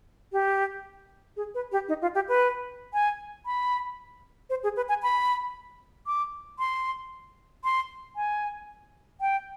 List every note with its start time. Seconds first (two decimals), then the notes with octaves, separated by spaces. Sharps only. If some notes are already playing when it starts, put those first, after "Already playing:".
0.32 G4
1.37 G#4
1.55 B4
1.72 G4
1.88 D#4
2.02 F4
2.15 G4
2.28 B4
2.93 G#5
3.46 B5
4.50 C5
4.63 G#4
4.77 B4
4.89 G#5
5.03 B5
6.07 D6
6.59 C6
7.64 C6
8.16 G#5
9.21 G5